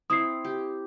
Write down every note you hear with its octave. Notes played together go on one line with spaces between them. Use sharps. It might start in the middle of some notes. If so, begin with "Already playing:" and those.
C4 E4 D#6 C7
G4